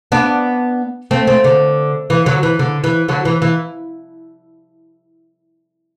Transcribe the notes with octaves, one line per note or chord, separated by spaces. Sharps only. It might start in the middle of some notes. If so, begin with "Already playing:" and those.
B3 D4
A3 C4
A3 C4
D3
E3
D3 F#3
E3
D3
E3
D3 F#3
E3
E3